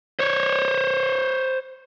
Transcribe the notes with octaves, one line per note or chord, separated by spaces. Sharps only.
C5 C#5